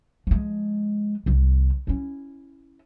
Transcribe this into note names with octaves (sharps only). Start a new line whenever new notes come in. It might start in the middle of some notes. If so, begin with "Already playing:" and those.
F3 G#3
C2 F3
C#4 E4